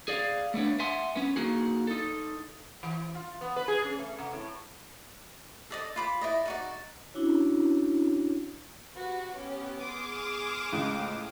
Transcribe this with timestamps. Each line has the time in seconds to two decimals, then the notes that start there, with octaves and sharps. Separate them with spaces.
0.08 G#4 D5 F5
0.54 A3 B3 D4 C#5
0.79 E5 F#5 G#5 A5 C6
1.16 B3 C#4
1.36 A#3 D#4 F#4 G#4
1.87 D#4 A4
2.83 E3
3.15 F4
3.41 B3
3.56 B4
3.68 G#4
3.84 C#4
3.99 A3
4.18 C3
4.33 A2
5.70 A4 D5 D#5
5.96 F4 B5 D6
6.21 E4 D5 D#5
6.45 D#4 F#4 D5
7.14 C#4 D4 E4 F#4 C#5
8.96 F#4 G4 B4
9.34 B3 C#4 G4
9.81 G#4 C6 D6 D#6 F6 E7
10.73 C#2 A2